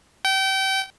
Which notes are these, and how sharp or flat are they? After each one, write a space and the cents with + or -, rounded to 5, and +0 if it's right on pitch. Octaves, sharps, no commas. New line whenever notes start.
G5 -30